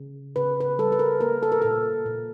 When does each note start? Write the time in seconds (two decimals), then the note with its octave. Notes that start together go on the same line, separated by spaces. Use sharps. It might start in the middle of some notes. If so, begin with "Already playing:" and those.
Already playing: C#3
0.36 C#3 B4
0.61 B4
0.79 G3 A4
0.92 B4
0.99 A#4
1.21 A#3 A#4
1.43 A4
1.52 A#4
1.62 A#2 A4
2.06 A#2